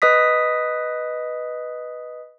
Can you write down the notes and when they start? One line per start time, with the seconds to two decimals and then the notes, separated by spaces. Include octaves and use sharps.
0.02 B4 D#5 D#6 B6